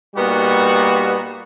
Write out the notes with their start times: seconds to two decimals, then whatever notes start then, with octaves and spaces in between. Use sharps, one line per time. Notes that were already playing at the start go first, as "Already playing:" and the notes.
0.16 A#2 G3 A#3 B3 D#4 F#4